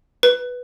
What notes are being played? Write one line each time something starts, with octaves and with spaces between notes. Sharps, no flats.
B4